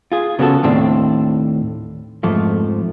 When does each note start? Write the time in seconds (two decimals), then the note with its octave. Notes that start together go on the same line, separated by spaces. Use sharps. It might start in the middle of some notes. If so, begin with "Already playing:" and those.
0.12 F4 G#4
0.39 C#3 B3 F#4 A4
0.63 D#2 A2 C4 D4
2.23 F2 G#2 F3 A3